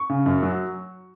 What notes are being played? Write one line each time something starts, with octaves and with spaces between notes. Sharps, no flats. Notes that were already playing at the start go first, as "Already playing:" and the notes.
Already playing: C#6
C#3
F#2
F#3